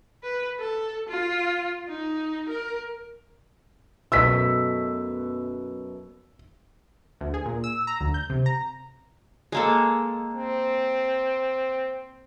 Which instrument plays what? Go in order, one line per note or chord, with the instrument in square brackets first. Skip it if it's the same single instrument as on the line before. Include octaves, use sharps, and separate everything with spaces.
[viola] B4
A4
F4
D#4
A#4
[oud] F#2 B2 A3 [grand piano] E6 B6
[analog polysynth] D2
G#4
A#2
E6
A#5
D2
G6
C3
A#5
[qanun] G#3 A#3 A4
[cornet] C4